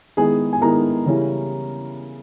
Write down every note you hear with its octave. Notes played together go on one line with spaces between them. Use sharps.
D#3 G#3 B3 E4 G#4 G#5
G#5
D#3 G#3 B3 E4 A#4 A#5
C#3 E3 G3 C#4 E4